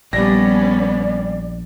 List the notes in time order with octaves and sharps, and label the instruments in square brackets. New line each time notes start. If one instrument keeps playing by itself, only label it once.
[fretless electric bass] A#1 [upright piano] G3 A#6 [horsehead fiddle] B3 C#4 [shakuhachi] D5